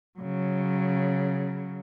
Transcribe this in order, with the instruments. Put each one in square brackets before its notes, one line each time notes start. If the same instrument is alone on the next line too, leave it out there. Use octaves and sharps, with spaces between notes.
[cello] C#3 F#3